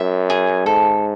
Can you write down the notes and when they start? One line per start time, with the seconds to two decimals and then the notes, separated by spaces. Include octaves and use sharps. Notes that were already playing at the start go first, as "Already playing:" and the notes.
Already playing: F#2 E5
0.30 G#4
0.65 G#2 A4